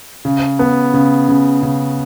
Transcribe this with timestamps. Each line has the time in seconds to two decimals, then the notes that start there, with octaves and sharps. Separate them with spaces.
0.25 C#3
0.59 B3
0.94 C#3
1.29 C#3
1.62 C#3